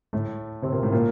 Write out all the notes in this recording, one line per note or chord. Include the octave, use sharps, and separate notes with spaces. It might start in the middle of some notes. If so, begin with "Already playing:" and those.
A2 A3
C3 C4
A#2 A#3
A2 A3
A#2 A#3